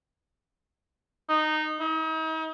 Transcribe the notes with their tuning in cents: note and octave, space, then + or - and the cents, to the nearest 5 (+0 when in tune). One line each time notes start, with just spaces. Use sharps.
D#4 -15
D#4 +40